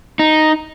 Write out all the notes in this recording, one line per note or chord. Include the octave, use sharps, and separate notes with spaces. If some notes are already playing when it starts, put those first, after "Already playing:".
D#4